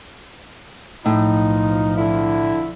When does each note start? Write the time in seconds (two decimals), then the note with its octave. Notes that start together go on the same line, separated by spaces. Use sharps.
1.06 B1 A2 F3 D#4
1.97 D3 E4